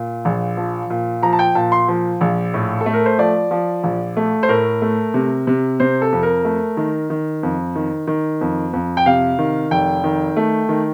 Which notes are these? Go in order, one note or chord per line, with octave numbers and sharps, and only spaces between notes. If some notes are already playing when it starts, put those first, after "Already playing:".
Already playing: A#2
A#1
F3
A#2
F3 A#5
A5
G5
A#2 A5
C6
F3
A#1
A2
A4
A3
A#4
C5
F3 D5
F3
A#1
A3
C5
A2 A#4
A3
C3
C3
C3 C5
A4
F2
A#4
A3
D#3
D#3
F2
D#3
D#3
F2
F2
G5
C3 F5
D#3
F1 G5
D#3
A3
D#3